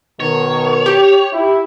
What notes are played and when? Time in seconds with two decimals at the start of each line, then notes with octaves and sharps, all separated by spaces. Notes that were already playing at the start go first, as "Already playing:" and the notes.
0.20 B2 D#3 C#5
0.86 G4
1.33 E4